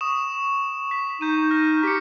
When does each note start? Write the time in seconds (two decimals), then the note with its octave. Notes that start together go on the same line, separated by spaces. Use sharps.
0.01 C#6 D#6 E7
0.91 B6
1.21 D#4 G6 D#7
1.51 F6 A#6
1.83 G4 B6 C#7